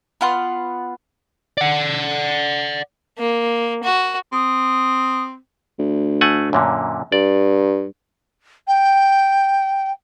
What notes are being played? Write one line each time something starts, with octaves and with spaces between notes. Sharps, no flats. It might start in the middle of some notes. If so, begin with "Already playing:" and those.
B3 F4 F#5 C6
D5 F#5
A#3
F#4
C4 D#6
D2
A3 F#5 G#5
F#2 A#2 D3
G2 D5
G5